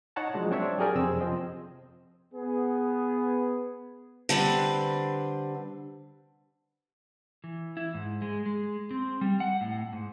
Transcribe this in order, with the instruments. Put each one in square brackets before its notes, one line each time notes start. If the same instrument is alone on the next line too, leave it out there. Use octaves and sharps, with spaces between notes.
[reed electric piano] D#4 C#5 F#5 A5 A#5
F3 F#3 G#3 D4
C4 D4 C#5 E5
F#3 G4 G#4 A#4 D5
F2 C3 C4 G#4 E6
F3 C4 D#5
[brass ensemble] B3 G#4
[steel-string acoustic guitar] D3 G3 C4 B4
[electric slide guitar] E3
E4
G#2
G#3
G#3
C4
G3
F#5
A2
G#2